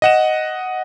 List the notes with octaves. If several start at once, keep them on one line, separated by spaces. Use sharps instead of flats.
D#5 F#5 E7